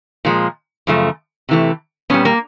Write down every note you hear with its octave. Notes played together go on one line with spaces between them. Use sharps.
A#2 F3 G#3
F#2 C#3 F3 A3
C3 E3 A3
A#2 G3 B3 C#4
A#3